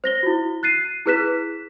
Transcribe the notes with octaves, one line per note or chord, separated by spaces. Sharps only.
C5 A#6 G7
E4 F#4
F#6 A6 C7 D#7
E4 G#4 B4 F#6 B6 E7